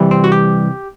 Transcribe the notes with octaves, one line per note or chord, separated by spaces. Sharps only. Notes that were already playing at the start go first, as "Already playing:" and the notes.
Already playing: C3 E3 G3
C4
F#4
G4